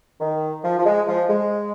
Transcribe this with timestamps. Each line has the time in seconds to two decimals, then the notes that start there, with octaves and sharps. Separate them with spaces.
0.21 D#3
0.64 F3
0.79 F3
0.86 G#3
1.07 F3
1.29 G#3